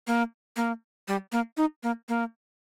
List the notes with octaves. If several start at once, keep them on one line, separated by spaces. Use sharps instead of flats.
A#3
A#3
G3
A#3
D#4
A#3
A#3